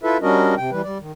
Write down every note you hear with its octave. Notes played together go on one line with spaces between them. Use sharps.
E4 F4 A4 B4 E5
G3 C#4 D4 F#4 A#4 D#5
C3 G5
E3 G3 B4
G3 D5
D#3